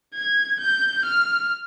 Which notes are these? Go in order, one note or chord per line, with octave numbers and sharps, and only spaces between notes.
G#6
G6
F6